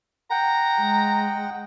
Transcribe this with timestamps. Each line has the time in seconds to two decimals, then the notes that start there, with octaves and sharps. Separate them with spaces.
0.31 F#5 G5 A#5
0.80 G#3